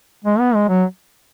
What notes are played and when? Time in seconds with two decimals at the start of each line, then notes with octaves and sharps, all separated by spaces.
0.24 G#3
0.39 B3
0.54 G#3
0.68 F#3